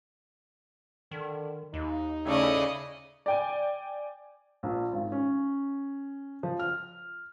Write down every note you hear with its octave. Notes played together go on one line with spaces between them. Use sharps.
D3 D#3
D#2 D#4
C#3 A3 C#4 E4 D5 D#5
D5 G5 G#5
A#1
G#1
C#4
F3
F6